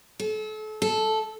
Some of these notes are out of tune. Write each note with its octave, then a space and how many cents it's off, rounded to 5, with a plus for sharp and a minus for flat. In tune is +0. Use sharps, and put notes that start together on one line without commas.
A4 -35
A4 -10